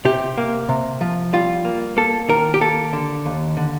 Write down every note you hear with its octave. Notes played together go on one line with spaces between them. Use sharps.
C3 G4
A#3
C3
F3
G3 F4
A#3
A#3 A4
D#3 A#4
G4
A#3 A4
D3
D#2
D3